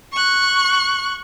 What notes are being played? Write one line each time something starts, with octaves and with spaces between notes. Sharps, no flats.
C#6 F#6